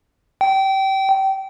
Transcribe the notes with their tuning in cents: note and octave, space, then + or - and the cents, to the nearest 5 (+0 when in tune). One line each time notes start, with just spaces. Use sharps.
G5 -25